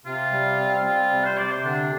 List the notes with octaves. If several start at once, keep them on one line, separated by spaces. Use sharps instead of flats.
C3 F4
G3
C4
G3 F4
C3
C5
C3 D5
C5
D3 D4